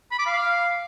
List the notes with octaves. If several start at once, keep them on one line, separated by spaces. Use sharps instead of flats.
B5
D6
F5